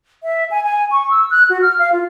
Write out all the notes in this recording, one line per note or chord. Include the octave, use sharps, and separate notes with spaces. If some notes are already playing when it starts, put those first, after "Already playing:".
E5
G#5
G#5
C#6
E6
F#6
F#4
F6
F5
F4